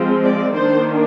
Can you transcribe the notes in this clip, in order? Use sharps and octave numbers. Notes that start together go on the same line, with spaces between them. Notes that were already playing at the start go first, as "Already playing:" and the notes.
Already playing: F3 G#3 C4
D5
D#3 A#3 D4 C5